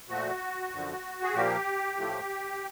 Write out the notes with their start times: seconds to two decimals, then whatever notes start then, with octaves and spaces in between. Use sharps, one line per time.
0.09 A#2 F3 A3 F#4
0.72 F#2 D3 F3
1.23 G#4
1.34 A#2 F3 A#3 G4
1.97 A2 F3 A3